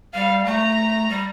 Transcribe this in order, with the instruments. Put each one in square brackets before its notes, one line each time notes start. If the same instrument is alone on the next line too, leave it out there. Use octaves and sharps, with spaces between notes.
[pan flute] G3 [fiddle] F5
[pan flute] A3 [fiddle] A#5
[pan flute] G3